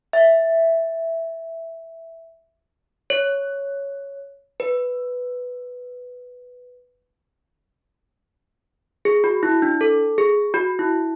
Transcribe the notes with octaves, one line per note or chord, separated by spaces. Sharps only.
E5
C#5
B4
G#4
F#4
E4
D4
A4
G#4
F#4
E4